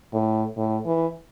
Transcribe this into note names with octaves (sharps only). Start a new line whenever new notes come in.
A2
A2
E3